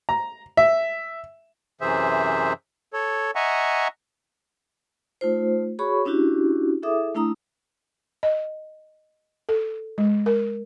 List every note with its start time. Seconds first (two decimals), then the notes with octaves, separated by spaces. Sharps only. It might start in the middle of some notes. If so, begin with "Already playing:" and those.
0.09 A#5
0.57 E5
1.81 F#2 C3 E3 G#4 C5 E5
2.93 A4 C#5
3.35 D#5 E5 F#5 G#5 A#5 C#6
5.21 A3 D#4 F4 C5
5.79 F#4 G#4 C#5 B5 C#6
6.05 C#4 D4 E4 F#4 G4
6.83 E4 G#4 A4 E5 D6 D#6
7.15 A3 D4 E4 A#5 D#6
8.23 D#5
9.49 A4
9.98 G#3
10.26 A#4